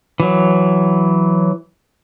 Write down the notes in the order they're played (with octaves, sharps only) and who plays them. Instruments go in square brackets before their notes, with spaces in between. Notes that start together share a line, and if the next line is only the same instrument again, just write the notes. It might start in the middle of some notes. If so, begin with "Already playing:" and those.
[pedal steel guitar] E3 F#3